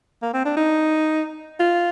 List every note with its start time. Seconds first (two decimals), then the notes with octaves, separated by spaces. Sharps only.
0.22 A#3
0.34 C4
0.45 D4
0.57 D#4
1.60 F4